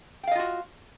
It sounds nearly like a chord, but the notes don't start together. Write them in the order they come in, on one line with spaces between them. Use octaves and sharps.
G5 F5 D#5 F4 F#4